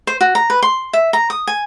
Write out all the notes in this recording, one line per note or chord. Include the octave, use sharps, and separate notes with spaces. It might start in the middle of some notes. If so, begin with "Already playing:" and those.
C5
F#4
A#5
B4
C6
E5
A#5
D#6
G#5